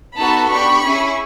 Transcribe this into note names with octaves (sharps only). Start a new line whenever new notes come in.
B3 D#4 F#4 A4 A5 B5
B3 D4 G4 B5 C#6
C#4 E4 G#4